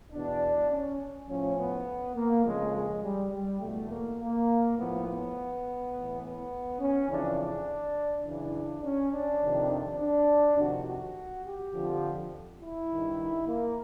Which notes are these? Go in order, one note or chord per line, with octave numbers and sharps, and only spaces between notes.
E2 B2 D4
C#4
A2 F3 C#4
B3
A#3
F2 C#3 F3 G#3
G#3
G3
G3
E2 B2 A3
A#3
A#3
A2 F3 B3
B3
A2 E3
B3
C#4
F2 C#3 E3 D4
D4
F#2 C#3 E3 D4
C#4
D4
F2 C3 D#3
D4
D4
F2 C3 D#3 F#4
F#4
G4
F2 D3 F3
E4
G2 D#3
A#3